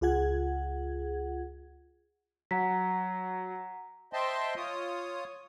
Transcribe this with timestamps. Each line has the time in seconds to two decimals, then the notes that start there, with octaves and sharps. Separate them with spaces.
0.01 C#2 F4 G#4 F#5 G#6
2.51 F#3 F#5 A#5 B6
4.13 C5 D#5 E5 G5 A5 C6
4.56 F4 C#5 D#6